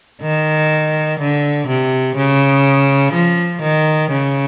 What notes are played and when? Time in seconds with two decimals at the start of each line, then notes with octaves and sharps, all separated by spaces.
0.22 D#3
1.19 D3
1.67 C3
2.16 C#3
3.13 F3
3.62 D#3
4.11 C#3